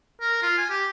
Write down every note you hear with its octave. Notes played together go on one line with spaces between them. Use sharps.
A#4
F4
G#5
G4